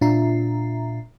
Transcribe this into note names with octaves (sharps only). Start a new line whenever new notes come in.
A#2 D4 F4 E5 A#5 C7